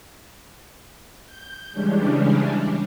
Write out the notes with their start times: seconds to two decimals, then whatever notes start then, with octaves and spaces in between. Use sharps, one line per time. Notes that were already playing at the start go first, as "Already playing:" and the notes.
1.25 G6
1.72 C#3 E3 G3 G#3 C#4 D4